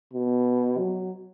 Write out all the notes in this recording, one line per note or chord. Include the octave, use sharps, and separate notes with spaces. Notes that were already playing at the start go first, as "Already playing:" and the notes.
B2
F#3